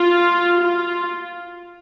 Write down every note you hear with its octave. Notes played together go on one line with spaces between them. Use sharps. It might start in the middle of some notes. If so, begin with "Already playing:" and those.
Already playing: F4
F4